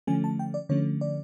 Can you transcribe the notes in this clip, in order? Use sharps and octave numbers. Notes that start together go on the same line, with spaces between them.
D3 F3 A3 C#4 G#5
A5
G5
D5
D3 F3 A3 C#4 C#5
D5